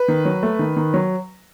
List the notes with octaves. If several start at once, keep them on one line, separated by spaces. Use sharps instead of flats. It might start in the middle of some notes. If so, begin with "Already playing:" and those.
Already playing: B4
D#3
F#3
A3
D#3
D#3
F#3